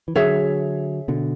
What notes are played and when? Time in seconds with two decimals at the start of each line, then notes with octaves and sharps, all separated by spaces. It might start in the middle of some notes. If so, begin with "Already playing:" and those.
0.08 E3
0.15 D3 F#3 G#4 C#5 E5
1.08 B2 D3